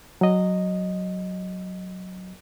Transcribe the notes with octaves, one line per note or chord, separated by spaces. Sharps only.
F#3 D#5